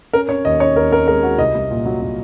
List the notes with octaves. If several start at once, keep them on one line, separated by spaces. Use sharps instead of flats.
C#4 A#4
C#4 C#5
D#2 D#5
C#4 C#5
D#2 A#4
C#4 A#4
G#3 A#4
G#3 F#4
C2 D#5
C2
A#2
F#3
F#3